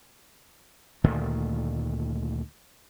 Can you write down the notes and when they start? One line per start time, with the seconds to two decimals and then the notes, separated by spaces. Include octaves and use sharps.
1.04 D2 A#2 D#3 A3